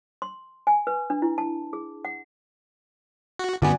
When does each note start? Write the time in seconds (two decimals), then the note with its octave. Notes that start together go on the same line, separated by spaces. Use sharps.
0.22 C6
0.67 G#5
0.87 B4
1.10 D4
1.22 E4
1.38 A5
1.73 G#4
2.05 F#5
3.39 F#4
3.62 G2 D3 G3 B3 C#4 F#4 D5 G#5